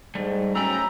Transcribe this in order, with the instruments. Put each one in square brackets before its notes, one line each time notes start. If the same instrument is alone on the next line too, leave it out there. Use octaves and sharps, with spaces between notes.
[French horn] G#2 [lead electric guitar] G3 A3
[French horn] F#3 [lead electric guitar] A3 B5 [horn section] C#4 G5 A#5 [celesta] E6